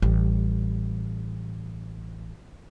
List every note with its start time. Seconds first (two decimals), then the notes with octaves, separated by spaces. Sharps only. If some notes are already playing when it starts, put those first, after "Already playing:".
0.02 A1 G3